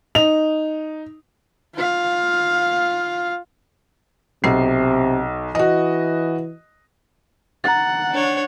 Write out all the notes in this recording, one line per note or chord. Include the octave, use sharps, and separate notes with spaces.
D#4 F7
F4 F5
B1 C3 C7
E3 F#4 D#5
F#5 A#5 A6
D4 C#5